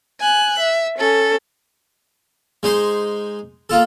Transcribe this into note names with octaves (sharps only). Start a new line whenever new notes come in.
G#5 F#6
E5
C#4 A4
G#3 D#4 C5 C6
A#3 F4 A4